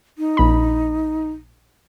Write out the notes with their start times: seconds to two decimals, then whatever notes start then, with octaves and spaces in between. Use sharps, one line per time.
0.18 D#4
0.37 A#1 B5